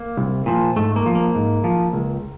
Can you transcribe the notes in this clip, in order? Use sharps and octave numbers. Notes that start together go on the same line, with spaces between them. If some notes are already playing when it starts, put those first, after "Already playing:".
Already playing: A#3
C2
A#2 F3
G#2 A3
A#3
F3
A#3
G#2
F3
C#2